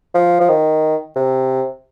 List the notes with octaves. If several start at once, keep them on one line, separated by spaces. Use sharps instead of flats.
F3
F3
D#3
C3